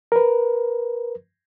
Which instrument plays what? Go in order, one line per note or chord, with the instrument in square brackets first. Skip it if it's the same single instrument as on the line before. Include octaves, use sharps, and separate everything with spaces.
[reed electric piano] A#4 B4